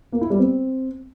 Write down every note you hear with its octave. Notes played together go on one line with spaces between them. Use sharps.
A#3
E4
G3
C4